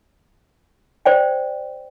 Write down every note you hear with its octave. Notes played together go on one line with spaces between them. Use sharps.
C5 D5 G5